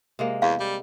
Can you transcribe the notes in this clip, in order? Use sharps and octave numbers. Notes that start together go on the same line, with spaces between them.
C3 G#3 A#3
E2 F5
G3